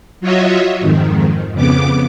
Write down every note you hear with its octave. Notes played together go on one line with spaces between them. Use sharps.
F#3 F4 F#4 C#5 D#5 E5
F2 G#2 D#3
F2 C#3 B3 D6